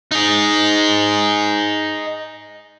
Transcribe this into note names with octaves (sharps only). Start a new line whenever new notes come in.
D#4 G#4